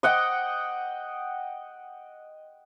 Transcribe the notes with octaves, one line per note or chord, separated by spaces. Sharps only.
D#5 F#5 G5